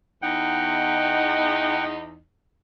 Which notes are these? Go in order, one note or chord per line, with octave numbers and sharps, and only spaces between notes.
E2 D#4 F#5 G5